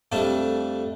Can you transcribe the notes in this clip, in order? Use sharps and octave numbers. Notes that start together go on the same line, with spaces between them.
F2 G3 A3 D4 A5